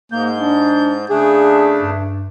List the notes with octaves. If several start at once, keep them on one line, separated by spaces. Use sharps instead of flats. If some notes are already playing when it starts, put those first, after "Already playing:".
G#2 A#3 G6
D4
C#3 A3 D4 G#4
G2